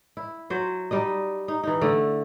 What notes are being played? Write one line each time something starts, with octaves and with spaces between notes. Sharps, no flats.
E4
F#3 C5
G3 D#4 D#5
D#4
E3 D#4
D3 A3